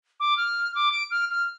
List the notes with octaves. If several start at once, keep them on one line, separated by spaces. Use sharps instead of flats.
D6
F6
D6
D7
F6
F6